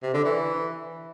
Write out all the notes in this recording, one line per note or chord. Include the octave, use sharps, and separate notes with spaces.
C3
D3
E3